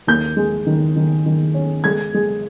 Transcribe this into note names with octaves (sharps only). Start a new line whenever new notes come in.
D#2 G6
G#3
D#3
D#3
D#3
C#4
G#3 G#6
G#3